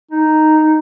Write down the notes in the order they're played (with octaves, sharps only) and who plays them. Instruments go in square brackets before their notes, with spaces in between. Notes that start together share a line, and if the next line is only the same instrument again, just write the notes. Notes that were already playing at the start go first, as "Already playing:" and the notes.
[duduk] D#4